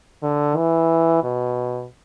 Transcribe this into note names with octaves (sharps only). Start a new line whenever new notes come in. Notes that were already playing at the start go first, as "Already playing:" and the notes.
D3
E3
B2